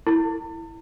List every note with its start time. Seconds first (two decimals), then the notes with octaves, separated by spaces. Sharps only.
0.07 E4